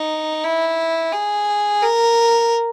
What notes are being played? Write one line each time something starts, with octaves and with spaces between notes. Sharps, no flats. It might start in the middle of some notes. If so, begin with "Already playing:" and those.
Already playing: D#4
E4
G#4
A#4